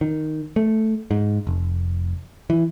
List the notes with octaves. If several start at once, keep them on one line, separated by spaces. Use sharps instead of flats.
D#3
A3
G#2
F1
E3